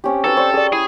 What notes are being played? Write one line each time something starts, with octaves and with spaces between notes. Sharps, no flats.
C4 C#4 G4
D#4 F#4 A4 B4
C5 D5 C#6
G#4 D5
E4 G#4